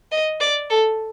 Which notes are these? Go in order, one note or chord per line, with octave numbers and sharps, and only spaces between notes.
D#5
D5
A4